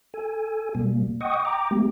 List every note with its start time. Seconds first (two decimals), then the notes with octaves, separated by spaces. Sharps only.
0.14 A4 G#5
0.75 B2 G3 A#3
1.21 D#5 F#5 G5 C#6 D#6
1.45 G5 A#5 D6
1.71 G#3 A3 B3 G4